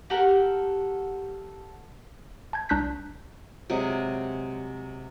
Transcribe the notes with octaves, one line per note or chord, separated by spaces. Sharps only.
F#4 G4 A4 A#4
A5 G6 G#6
C2 D4 A#5 F#6 G6 B6
C3 F#3 G#3